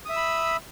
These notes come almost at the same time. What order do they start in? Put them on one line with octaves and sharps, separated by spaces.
D#6 E5 E6 B5